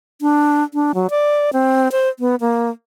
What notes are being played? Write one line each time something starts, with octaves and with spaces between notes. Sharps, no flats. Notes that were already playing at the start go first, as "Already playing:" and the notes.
D4
D4
F#3
D5
C4
C5
B3
A#3